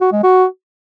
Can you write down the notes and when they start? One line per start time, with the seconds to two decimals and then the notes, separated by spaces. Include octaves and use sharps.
0.01 F#4
0.12 G#3
0.23 F#4